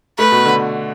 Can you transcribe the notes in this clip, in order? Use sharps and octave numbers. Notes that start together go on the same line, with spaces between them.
A3 B4
B2
D3